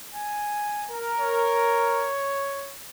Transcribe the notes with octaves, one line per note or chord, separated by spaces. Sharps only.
G#5
A#4
C#5